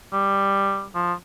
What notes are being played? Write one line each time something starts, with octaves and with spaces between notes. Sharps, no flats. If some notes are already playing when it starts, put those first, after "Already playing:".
G3
F3